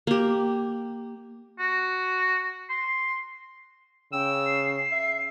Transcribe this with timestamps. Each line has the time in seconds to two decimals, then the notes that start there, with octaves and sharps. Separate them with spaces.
0.07 A#3 G4
1.59 F#4
2.70 C6
4.13 C#3 G5 E6
4.47 C7
4.92 E5